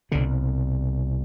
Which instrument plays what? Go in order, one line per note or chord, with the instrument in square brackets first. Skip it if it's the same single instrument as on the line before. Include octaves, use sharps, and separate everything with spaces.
[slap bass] C2 B2 D3